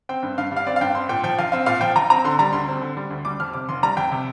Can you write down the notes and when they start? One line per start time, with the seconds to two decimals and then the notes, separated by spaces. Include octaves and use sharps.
0.09 C4 G5
0.23 G2
0.38 G2 F5
0.52 G3 F5
0.67 C4 D5
0.76 F5
0.81 G2 G5
0.94 C4 C6
1.09 A#2 G5
1.23 F3 G5
1.39 A#1 F5
1.52 C4 F5
1.66 A#2 F5
1.81 F3 G5
1.96 A#1 A#5
2.10 C4 A#5
2.25 D3 C6
2.39 G3 A#5
2.53 D2 C6
2.68 C4
2.82 D3
2.97 G3
3.11 D2
3.25 G3 D6
3.40 F2 F6
3.53 C3 D6
3.69 F1 C6
3.83 G3 A#5
3.97 F2 G5
4.12 C3